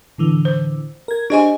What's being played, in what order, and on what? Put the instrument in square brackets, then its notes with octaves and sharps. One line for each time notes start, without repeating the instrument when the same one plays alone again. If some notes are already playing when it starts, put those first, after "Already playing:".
[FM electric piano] A2 D3 E3
[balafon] C5
[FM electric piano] A#4 G#6
[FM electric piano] D4 G#4 C5 [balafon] G4 D#5 G#5